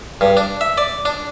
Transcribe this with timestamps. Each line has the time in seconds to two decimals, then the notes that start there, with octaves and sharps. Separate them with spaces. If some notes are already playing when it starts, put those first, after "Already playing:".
0.21 G2
0.37 D4
0.61 E5
0.78 D5
1.05 D4